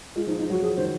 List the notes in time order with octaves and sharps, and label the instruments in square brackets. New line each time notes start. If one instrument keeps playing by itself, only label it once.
[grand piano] G#3 [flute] F4
[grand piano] F3 [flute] D#4
[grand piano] F3 [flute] D#4
[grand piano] F#3 [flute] F#4
[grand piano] F3 [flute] G#4
[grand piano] D#3 [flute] C5